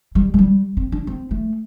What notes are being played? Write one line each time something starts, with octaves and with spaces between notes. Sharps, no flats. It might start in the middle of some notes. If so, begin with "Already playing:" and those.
G3
A3
G3
C4
D4
C4
A3